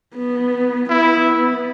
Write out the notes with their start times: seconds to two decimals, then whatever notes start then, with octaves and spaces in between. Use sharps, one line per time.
0.15 B3
0.90 B3 E4